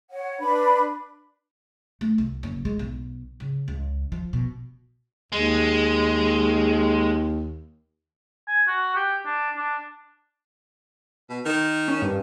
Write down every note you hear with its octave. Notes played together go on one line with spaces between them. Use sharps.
C#5 F#5
D4 B4 B5
A3
C2
F#1
G#3
B1
C#3
C#2
F3
B2
D#2 G#3
G#5
F#4
G4
D4
D4
B2
D#3
C#4
G2